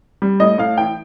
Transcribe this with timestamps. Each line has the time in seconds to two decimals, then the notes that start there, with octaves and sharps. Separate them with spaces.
0.22 G3
0.40 A2 D#5
0.58 A2 F5
0.78 E3 G5